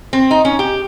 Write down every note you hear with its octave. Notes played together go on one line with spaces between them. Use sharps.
C4
D#4
C#4
G4